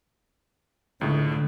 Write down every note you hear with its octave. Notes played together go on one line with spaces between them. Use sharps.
C#2 A2 D3